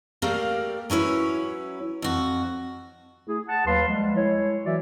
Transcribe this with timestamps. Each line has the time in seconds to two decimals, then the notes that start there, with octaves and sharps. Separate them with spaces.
0.22 A3 A#3 G4 A#4 D5 F5
0.90 F#3 C#4 E4 B4 C#5
2.02 F2 F#4
3.27 A3 E4 G#4
3.48 F#5 A5
3.66 D#2 F#3 B4 F5 C6
3.87 F3 G3 G#3
4.16 G#3 E4 C#5
4.65 E3 F#3 F#4 D5 E5